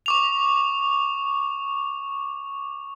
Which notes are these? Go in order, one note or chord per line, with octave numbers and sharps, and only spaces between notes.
C#6 D6 F7